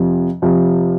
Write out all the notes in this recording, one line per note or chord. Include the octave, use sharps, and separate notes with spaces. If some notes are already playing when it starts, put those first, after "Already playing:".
Already playing: F2 C3 F3
F2 C3 F3